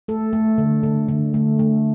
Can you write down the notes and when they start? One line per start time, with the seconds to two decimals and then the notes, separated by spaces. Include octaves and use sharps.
0.08 A3 A4
0.33 A3
0.58 D3
0.83 D3
1.08 D3
1.34 A3
1.59 A3